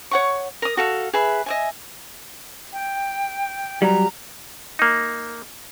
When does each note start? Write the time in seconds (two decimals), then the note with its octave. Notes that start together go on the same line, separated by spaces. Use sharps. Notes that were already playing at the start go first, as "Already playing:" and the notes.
0.11 C#5 F#5 C#6
0.62 A#4 D#6
0.77 F#4 A4 F5
1.14 G#4 B4 E5 B5
1.46 D#5 E5 G#5
2.73 G5
3.82 F#3 G3 A#5
4.79 A#3 D#4